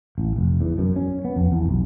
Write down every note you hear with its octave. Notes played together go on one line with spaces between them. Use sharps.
A1
F1
E2
F#2
C#4
B3
F2
E2
B1